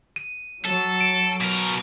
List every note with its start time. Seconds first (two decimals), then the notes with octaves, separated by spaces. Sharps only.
0.16 D#7
0.65 F#3 A4
1.01 D7
1.41 B2 A#4